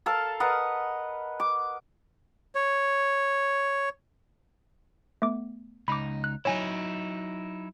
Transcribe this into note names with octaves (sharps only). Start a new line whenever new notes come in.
A4 A#4 F5 A5
A#4 B4 D#5 F#5
D6
C#5
A3 B3 D6
C#2 D#4 B5 D6
F#6
F#3 D#4 E4 C#5 G#5